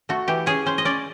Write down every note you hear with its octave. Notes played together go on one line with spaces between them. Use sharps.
A3 F#4
E3 G4
C#4 G#4
C#4 C5
D#5
C#4 D5